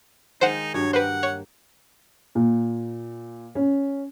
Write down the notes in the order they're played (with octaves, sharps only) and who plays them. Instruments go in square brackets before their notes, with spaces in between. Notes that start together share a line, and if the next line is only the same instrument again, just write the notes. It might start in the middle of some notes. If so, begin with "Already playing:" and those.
[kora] D#3 G#3 F5 [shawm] D#4 [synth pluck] C5 F#5
[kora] G2 F#3 [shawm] C#5
[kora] A#3 G5 [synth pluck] B4 C5 [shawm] F#5
[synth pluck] C#5
[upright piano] A#2
C#4